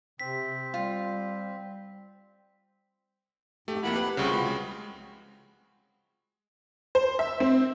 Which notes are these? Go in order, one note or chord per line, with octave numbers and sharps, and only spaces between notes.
C3 C4 B6
G3 F4
F2 G#2 A3 G4
F2 A#3 E4 F#5 B5
G4 B4
C2 C#3 F3 C4 F#4
G#3 B5
G#3
C5
E5
C4